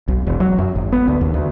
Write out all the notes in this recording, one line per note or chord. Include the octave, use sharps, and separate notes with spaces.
B1
E1
F#3
F#2
G#1
B3
D2
D#2
D2